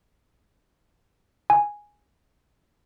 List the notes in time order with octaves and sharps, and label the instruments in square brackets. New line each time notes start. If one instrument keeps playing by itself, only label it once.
[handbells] G#5